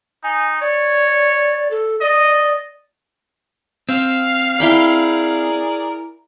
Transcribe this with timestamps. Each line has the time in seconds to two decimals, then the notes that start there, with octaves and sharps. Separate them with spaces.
0.24 D#4 G#5
0.61 C#5 D5
1.71 A4
2.01 D5 D#5
3.89 C4 F5
4.60 E4 G#4 A#4 D5 G5 B5